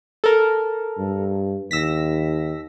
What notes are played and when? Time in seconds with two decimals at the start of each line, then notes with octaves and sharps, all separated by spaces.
0.24 A4 A#4
0.98 G2
1.71 D#2 E6 A#6 B6